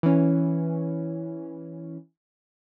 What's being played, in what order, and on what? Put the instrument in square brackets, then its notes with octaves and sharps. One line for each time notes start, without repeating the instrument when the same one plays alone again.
[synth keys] E3 C#4